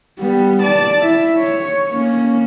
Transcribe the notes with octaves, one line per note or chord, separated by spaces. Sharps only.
G3 B3
D5 A5
E4 E5
C#5
A#3 C#4